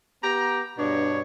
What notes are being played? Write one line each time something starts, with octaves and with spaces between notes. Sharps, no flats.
B3 G4 A#5
G2 B2 D4 C#5